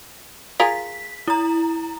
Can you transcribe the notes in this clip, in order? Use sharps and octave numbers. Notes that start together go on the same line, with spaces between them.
F4 G#4 A#4 B6
E4 A#5